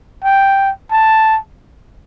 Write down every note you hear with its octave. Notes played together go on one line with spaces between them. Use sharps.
G5
A5